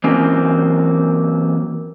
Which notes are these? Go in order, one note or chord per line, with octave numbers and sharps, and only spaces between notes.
E3 F#3 A#3 C4 C#4